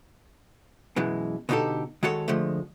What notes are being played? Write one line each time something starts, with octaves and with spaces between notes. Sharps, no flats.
F#2 B2 E3 G#3
B2 D3 D#4 F#4 G4 A4
D#3 G#3 F#4 A4 C#5
D3 F3 G#3 A3